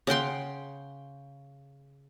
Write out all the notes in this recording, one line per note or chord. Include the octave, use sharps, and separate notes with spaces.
C#3 F#5 G5 C6